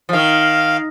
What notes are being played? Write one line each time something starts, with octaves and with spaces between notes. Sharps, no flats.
F3
D#3 F5